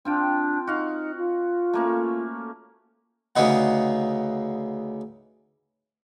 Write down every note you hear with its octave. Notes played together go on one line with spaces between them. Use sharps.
C4 D4 F4 G5
D#4 F#4 F5
F4
A3 A#3 C#4
D2 C#3 B3 D#4 F#5